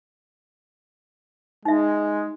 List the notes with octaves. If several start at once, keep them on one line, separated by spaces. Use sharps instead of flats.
G#3 D#4 E5